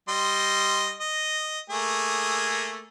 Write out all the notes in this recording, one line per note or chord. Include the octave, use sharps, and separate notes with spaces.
G3 D#5 C6
D#5
A3 A#3 G#4